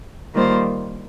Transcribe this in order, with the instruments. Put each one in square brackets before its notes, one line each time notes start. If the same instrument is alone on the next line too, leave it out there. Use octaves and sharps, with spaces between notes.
[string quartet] D#3 G3 A#3 F4 C5